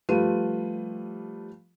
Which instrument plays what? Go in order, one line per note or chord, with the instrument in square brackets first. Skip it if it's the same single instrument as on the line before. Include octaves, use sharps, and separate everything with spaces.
[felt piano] F3 G3 A3 F4 B4 D#7